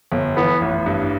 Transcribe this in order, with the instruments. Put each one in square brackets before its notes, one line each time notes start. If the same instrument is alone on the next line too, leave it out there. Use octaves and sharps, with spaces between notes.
[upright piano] G1
[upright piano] E3 [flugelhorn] B3
[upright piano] A1
G2